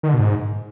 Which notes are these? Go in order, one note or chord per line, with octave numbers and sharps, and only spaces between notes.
D#3
D3
B2
G#2